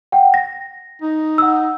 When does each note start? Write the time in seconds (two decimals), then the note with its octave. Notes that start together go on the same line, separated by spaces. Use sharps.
0.12 F#5 G5
0.34 A#6
1.02 D#4
1.38 F#5 E6